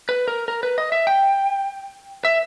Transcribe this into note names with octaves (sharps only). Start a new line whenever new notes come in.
B4
A#4
A#4
B4
D#5
E5
G5
E5